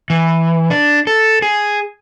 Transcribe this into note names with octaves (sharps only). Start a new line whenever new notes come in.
E3
D4
A4
G#4